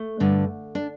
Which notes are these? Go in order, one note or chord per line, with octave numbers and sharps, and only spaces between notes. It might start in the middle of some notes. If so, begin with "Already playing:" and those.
Already playing: A3
G2 D3
D4